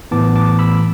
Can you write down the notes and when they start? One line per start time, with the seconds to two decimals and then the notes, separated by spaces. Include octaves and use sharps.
0.11 A2 E3 B3 A5 D6
0.36 A5 D6
0.59 B5 E6